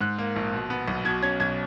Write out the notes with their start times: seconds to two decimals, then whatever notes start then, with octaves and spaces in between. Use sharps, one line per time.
0.01 G#2 F#6
0.19 A#3
0.36 A#1
0.53 B2
0.70 B3
0.88 B1
1.05 B2 G#6
1.23 C#4 G#6
1.40 B1 G#6